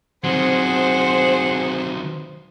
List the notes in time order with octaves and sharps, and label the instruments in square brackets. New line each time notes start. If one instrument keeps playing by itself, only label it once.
[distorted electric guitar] D#3 F#3 [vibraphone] C4 [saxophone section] G#4 F#5 [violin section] C5